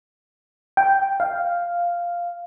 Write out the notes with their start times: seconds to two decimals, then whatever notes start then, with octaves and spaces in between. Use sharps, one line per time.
0.77 G5
1.20 F5